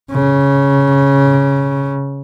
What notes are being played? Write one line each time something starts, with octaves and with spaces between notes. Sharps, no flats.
C#3